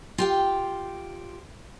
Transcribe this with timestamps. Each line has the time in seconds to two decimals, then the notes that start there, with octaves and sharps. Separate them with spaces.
0.18 F4 G4 G5